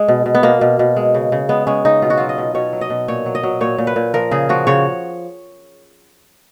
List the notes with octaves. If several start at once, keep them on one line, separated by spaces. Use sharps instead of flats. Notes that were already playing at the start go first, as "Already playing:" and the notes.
Already playing: G#3
B2
B2
B3
B2 A#3
B2
B2
G#3
C#3
C#3
G#3 B3
G#3 C#4
C#3 D#4
B2 F4
F#4
F#3 F4
D#5
B2
B2 C#5
F#3
D#5
B2
A#2 C#5
F#3
D#5
F#3
A#2 C#5
A#2
B4
A#2
F3 A#4
C#3 G#4
F3 F#4
C#3 C#5